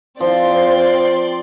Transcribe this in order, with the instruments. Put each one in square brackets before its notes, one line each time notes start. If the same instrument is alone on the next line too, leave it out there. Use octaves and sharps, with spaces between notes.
[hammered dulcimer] F3 [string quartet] C4 D5 C6 [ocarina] C5